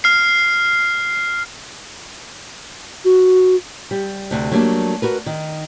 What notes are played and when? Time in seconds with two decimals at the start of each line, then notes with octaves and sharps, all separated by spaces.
0.04 F6 C7
3.05 F#4
3.91 G3
4.31 D2 C3
4.52 F#3 G3 A3 A#3 C4 D4
5.02 F#4 A#4 B4
5.26 D#3